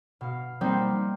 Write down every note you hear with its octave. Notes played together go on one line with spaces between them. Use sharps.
B2 F5
G3 A#3 C4 D#4 C5